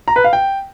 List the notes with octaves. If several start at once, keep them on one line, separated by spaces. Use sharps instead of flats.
A#5
B4
F5
G5